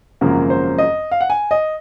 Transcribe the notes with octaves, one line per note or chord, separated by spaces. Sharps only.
G#1 F#2 C#3 F3 A#3 A#4
C5
D#5
F5
F#5
G#5
D#5